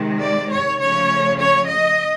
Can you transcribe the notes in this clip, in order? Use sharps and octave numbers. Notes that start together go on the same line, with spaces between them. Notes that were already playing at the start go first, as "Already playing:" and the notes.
Already playing: C3 D#3 G#3
D5
C#5
C#3 F3 A3 C#4 C#5
C#5
D#5